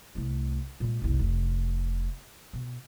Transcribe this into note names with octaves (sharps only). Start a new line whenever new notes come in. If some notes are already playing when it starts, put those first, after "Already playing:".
C2 A3
A#2 G#3
F#1 C2
F1
B2